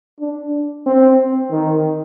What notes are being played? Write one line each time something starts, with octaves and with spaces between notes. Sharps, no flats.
D4
C4
D#3